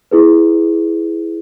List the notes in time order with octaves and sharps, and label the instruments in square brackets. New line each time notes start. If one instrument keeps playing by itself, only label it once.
[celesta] E4 G#4 B4